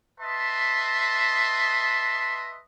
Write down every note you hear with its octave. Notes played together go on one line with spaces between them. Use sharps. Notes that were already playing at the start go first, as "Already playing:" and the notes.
B4 D#5 E5 A5 C6